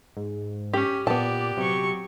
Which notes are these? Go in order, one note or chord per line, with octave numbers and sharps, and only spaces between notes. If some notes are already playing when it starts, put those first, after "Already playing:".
G#2
C#4 G4
A#2 B3 G4 D5 A5
C3 F#3 C#6